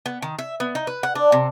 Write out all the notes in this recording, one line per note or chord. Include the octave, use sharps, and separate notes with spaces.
B3
D#3
E5
B3
D#4
B4
F#5
D4
C3